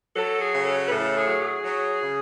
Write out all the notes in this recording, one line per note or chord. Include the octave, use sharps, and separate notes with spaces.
F#3 A4
G#4
C#3
A4
B4
A2 A4
G#4
F#3
G#4
F#3
C#3